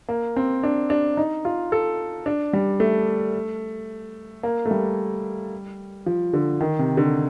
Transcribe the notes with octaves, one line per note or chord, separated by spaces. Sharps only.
A#3
C4
D4
D4
D#4
F4
A4
D4
G3
A3
A#3
A3
G3
F3
D3
D#3
C3
D3